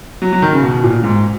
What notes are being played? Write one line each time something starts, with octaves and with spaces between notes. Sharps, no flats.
F#3
F#3
D#3
C#3
B2
A#2
G#2